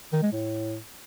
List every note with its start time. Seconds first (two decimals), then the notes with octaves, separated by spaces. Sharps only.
0.13 D#3
0.22 G#3
0.32 A2